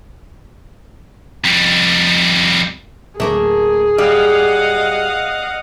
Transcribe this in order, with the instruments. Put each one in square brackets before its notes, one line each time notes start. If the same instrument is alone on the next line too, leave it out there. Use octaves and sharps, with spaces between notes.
[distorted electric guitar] F2 G3
[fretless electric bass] D1 [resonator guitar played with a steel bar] A3 A#3 A#4 [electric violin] G#4
[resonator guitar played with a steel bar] G3 [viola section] D#5 F5 F#5